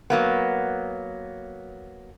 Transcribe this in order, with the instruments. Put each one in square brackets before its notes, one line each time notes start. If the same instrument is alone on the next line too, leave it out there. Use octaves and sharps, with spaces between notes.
[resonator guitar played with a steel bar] F#3 A#3 B3